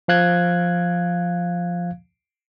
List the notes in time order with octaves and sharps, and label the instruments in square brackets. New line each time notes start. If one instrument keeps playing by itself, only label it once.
[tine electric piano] F3 F5 F#6 G#6